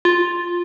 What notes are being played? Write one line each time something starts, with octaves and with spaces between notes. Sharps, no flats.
F4